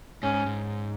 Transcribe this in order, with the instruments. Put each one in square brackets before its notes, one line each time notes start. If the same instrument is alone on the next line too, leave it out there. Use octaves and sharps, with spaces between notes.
[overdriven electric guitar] G#2 [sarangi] C#4
[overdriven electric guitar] G#2